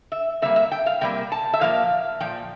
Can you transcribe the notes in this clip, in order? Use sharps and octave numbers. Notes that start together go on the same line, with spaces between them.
E5
C3 G3 A#3 E5
E5
G5
F5
C3 G3 A#3 G5
A5
E5
A#2 F3 A#3 F5
A#2 F3 G5